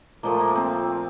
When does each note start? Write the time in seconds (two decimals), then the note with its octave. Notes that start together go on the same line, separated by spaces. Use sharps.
0.23 A#2 F3 A3 A#3
0.39 A#3
0.56 C4